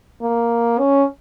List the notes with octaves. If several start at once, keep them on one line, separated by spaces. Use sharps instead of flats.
A#3
C#4